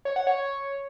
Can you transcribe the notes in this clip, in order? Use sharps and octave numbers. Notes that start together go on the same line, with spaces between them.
C#5
F#5
C#5